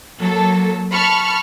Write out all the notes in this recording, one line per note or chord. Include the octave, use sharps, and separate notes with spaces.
F#3 A#3 A4
A5 B5 C#6 F6